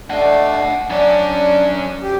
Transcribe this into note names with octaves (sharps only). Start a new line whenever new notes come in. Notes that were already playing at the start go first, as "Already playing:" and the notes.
A3 D4 D#5 F#5
F#2 C#4 D4
D2 G4